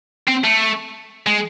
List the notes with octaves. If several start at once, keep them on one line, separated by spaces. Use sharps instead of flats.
C4
A3
G#3